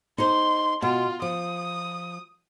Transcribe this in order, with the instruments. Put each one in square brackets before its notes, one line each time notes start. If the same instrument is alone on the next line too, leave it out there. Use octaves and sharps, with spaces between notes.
[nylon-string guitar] D#4 G#4 C5 [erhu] C6
[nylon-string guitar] B2 [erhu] F4
[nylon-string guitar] F3 [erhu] D#6